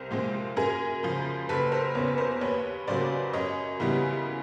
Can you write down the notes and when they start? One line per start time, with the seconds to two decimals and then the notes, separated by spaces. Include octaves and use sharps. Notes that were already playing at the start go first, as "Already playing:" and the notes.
Already playing: C2 A#4 C5
0.11 A#2 F3 G#3 C4
0.56 F#2 G#4 A#4
1.03 C#3 F3
1.49 F#1 A4 B4
1.72 A#4 C5
1.95 E2 C#3 B4 C#5
2.07 B4
2.18 A#4 C5
2.41 D#2 B4 C#5
2.87 C#3 F#3 A#3 C5 D5
3.33 F#2 C#5 D#5
3.80 C#3 E3 G3 B3